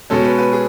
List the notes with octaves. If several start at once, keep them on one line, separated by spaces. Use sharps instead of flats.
B2 G#3 C#4 A4
B4
B4
G#4